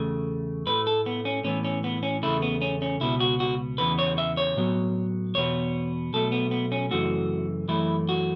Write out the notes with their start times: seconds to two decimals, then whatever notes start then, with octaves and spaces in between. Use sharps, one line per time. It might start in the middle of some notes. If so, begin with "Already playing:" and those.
Already playing: E2 C#3 A3
0.66 A2 A3 B4
0.87 A4
1.06 B3
1.25 C#4
1.44 A2 E3 B3 C#4
1.65 C#4
1.84 B3
2.03 C#4
2.23 E2 C#3 A3 E4
2.42 B3
2.62 C#4
2.82 C#4
3.00 C#2 B2 B3 E4
3.20 F#4
3.40 F#4
3.78 E2 C#3 E3 B3 B4
3.99 C#5
4.18 E5
4.37 C#5
4.56 A2 F#3 B3
5.35 E2 B2 B3 C#5
6.13 B1 B2 A3 A4
6.32 B3
6.51 B3
6.72 C#4
6.91 F#2 C#3 E3 A3 F#4
7.68 F#2 E3 A3 E4
8.09 F#4